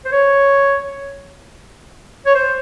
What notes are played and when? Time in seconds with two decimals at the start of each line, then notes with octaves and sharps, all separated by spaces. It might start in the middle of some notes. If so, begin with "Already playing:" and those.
0.05 C5
0.12 C#5
2.26 C#5
2.35 C5